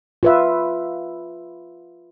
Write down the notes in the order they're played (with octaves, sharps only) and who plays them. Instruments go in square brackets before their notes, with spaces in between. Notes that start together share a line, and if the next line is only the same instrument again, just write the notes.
[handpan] F4 B4 E5